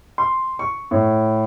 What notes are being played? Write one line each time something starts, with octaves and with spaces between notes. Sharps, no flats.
C6
C#6
A2